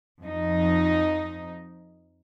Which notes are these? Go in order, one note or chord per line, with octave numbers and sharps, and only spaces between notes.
F2 D#4